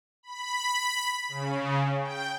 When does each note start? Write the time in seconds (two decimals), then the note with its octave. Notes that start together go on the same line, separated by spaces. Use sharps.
0.23 B5
1.28 C#3
2.02 G5